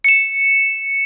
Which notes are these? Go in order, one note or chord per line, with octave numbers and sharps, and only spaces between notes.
C#7 E7